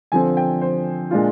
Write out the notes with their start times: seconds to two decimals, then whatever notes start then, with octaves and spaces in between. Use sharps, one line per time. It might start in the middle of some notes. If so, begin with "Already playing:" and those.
0.12 D3 F3 C4 G#5
0.37 G5
0.61 C5
1.11 A#2 G#3 D4 F4